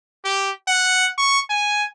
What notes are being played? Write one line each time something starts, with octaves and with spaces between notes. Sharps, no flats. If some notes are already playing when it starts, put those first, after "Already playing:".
G4
F#5
C#6
G#5